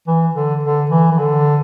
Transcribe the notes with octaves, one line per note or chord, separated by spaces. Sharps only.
E3
D3
D3
E3
E3
D3